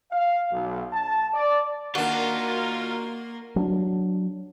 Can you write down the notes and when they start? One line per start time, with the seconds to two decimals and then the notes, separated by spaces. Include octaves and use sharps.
0.12 F5
0.52 B1
0.93 A5
1.34 D5
1.95 D#3 A#3 D4 F4 F#4 A#4
3.56 F#3 D4